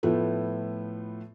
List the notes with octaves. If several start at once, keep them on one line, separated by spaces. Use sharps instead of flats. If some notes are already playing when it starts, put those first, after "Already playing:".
A2 F3 A3 B3